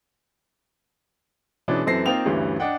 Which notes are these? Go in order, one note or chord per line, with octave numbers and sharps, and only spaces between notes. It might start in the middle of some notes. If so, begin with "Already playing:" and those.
B2 E3 G#3 B3 C#4 D4
F#2 E3 C4 A4 A#6 C7
A#3 C4 D#4 F4 G5 F7
D2 G2 E3 G3 C#4
D4 D#5 F#5 G5